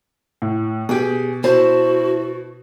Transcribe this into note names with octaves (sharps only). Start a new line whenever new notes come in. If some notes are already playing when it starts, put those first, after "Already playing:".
A2
B2 G4 G#4
E4 F#4 C5 A5